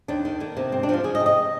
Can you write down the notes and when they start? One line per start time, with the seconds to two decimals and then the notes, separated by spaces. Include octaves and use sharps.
0.08 D#2 D4
0.25 D#3
0.40 D#3 A#3
0.57 C3
0.72 G#2 C4
0.83 D4
0.89 F3 F4
1.04 F3 G#4
1.15 D#5
1.20 C3
1.26 D#5